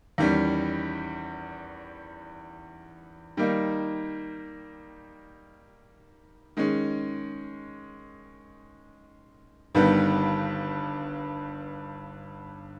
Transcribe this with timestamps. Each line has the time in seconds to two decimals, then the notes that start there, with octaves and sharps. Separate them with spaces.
0.18 E2 D#3 G3 C#4
3.37 D#3 G3 A#3 D#4
6.57 D#3 G#3 C#4
9.75 G1 G2 D#3 G3 B3